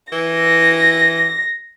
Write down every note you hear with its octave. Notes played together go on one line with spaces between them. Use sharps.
E3 A#6